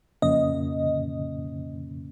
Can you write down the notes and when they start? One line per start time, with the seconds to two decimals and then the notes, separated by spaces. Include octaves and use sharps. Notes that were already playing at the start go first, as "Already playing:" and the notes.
0.22 F2 C#3 F3 A#3 C#4 D#5